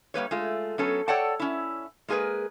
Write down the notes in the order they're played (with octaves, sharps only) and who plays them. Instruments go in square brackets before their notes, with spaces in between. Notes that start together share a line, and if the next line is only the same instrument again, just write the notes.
[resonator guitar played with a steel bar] G3 A#3 B4 C#5
G#3 A3 F4
F#3 B3 C#4 A4
A4 C#5 D5 F#5 G5 A5
C#4 E4
G#3 A#3 G#4 A#4 B4